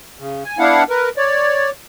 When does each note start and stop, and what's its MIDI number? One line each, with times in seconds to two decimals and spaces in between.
0.19 0.43 49
0.45 0.59 80
0.59 0.84 59
0.59 0.84 62
0.59 0.84 64
0.59 0.84 77
0.59 0.84 78
0.90 1.10 70
0.90 1.10 71
1.17 1.70 73
1.17 1.70 74